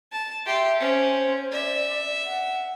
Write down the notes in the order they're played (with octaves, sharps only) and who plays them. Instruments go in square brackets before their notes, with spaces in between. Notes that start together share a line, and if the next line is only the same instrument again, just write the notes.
[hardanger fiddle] A5
[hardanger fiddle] G4 C6 [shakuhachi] E5
[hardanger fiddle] C#4 [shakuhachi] C5
[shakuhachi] D5 [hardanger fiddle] E5
[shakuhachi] F#5